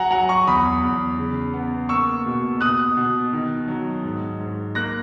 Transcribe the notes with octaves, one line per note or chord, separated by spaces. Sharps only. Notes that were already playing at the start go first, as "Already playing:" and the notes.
Already playing: F#3 F#5 G#5 A#5
F#3 F#5 A#5
A#5 C#6
E2 B5 D#6
E2
C#3
B3
A#3 C#6 E6
B2
B2 D#6 F#6
B2
D#3
F#3
G#2
G#2
A#3 F#6 A#6